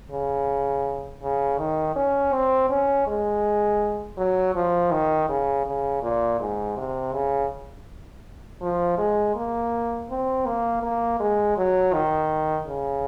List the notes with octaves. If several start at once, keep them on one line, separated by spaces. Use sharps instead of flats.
C#3
C#3
D#3
C#4
C4
C#4
G#3
F#3
F3
D#3
C#3
C#3
A#2
G#2
C3
C#3
F3
G#3
A#3
C4
A#3
A#3
G#3
F#3
D#3
C#3